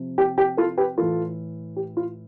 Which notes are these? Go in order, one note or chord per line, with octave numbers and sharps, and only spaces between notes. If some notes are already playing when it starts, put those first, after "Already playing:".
Already playing: C3 F3
G4
G4
F4 A4
G4 B4
A2 E3 F4 A4
G4
F4